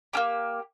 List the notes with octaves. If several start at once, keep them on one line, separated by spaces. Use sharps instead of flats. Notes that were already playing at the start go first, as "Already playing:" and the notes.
A#3 C#4 G4